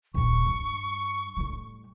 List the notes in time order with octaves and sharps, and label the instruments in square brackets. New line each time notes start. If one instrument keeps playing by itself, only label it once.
[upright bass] D#1 A#2 [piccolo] C#6
[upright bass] G2 G3
A2 G3